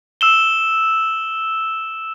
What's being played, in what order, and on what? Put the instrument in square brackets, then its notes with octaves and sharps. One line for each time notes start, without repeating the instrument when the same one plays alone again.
[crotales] E6 E7 G7